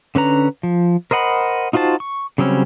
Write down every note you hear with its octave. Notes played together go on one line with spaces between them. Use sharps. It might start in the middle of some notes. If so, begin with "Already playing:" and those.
D3 C#4 B4 A#5
F3
A#4 C5 D#5 F#5 B5
D#4 F4 F#4 C5 A5
C#6
C#3 F#3 G3 C4 C#4